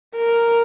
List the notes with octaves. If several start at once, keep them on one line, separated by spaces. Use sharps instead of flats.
A#4